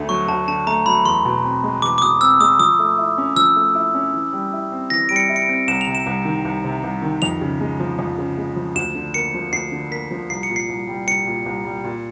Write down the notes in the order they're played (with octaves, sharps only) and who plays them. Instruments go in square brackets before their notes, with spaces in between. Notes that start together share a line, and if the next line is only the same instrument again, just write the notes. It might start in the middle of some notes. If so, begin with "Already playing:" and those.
Already playing: [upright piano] D2 D3 A3
[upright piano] F#3 [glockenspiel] C#6
[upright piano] D2 [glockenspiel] A5
[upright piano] D3 [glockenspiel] A5
[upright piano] A3 [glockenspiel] A#5
[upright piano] F#3 [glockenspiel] B5
[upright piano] E2 [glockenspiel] C6
[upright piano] B2
C4
G#3
[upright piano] E2 [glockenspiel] D6
[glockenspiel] D6
[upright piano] B2 [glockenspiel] D#6
[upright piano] C4 [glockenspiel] E6
[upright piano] G#3 [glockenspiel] D#6
[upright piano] F3 [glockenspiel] D#6
[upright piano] A3
E4
C#4
[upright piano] F3 [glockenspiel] E6
[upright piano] A3
E4
C#4
E3
G3
E4
C4
[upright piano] E3 [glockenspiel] A#6
[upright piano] G3 [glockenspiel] D7
[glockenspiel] C#7
[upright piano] E4
[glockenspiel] C#7
D7
[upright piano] C4
[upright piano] C2 [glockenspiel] E7
[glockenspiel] F7
[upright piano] C3
[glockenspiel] E7
[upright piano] C2
D#3
C2
C3
C2
D#3
[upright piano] F2 [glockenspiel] F7
[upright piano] C#3
G#3
F3
F2
C#3
G#3
F3
[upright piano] D2 [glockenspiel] E7
[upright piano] D3
[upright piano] A#3 [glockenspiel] C#7
[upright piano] F3
[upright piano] D2 [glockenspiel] C7
[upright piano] D3
[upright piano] A#3 [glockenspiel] B6
[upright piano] F3
[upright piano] C2 [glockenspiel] C7
[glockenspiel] C#7
[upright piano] A#2
[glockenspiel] C7
[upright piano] C2
G3
[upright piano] C2 [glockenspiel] C#7
[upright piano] A#2
C2
G3
A#2